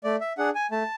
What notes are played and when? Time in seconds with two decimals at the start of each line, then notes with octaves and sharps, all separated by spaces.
0.04 A3 D5
0.21 E5
0.38 D4 G#4 F#5
0.55 G#5
0.71 A3 A5